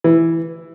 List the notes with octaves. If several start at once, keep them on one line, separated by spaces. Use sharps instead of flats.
E3